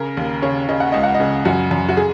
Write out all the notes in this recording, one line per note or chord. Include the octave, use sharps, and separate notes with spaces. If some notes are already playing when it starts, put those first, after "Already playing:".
Already playing: C#3 A#4
D#2
C#3 C#5
C#3 D#5
F#5
C#2 D#5
F#5
D#5
C#3
F#2 F#4
F#2
F#4
G#4